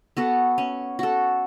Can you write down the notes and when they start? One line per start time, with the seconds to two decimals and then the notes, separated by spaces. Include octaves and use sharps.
0.17 B3 F#4 A4
0.58 C#4
0.99 F#4 A4